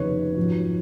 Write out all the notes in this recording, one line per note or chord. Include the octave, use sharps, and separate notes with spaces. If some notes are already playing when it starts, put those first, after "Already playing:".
Already playing: F1 D#2 C#3 B4 C#5
G#1 F#2 F3